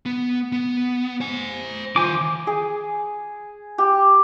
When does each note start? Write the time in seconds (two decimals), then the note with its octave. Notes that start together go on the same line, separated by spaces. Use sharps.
0.06 B3
0.52 B3
1.21 C5 G#5
1.96 D#3 F4 C5 G#5 D6
2.47 G#4
3.78 G4